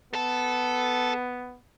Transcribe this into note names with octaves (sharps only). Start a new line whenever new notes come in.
B3 A4 A5